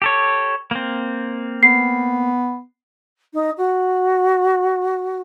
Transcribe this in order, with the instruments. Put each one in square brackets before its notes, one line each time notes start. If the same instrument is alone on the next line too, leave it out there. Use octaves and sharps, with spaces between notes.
[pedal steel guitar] G4 A4 C#5
A#3 C4
[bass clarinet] B3 [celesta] C7
[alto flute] D#4
F#4